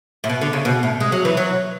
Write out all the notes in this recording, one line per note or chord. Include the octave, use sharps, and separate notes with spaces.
A2
B2
D3
C#3
B2
A2
G#3
F#3
E3
F#3